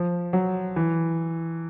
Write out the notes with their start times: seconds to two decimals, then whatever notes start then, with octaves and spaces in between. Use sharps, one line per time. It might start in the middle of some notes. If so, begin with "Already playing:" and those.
Already playing: F3
0.33 F#3
0.76 E3